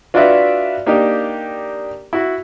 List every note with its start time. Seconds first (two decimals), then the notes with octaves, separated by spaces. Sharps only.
0.14 D4 F4 F#4 B4 D5 E5
0.86 A#3 D4 D#4 G4
2.13 E4 F#4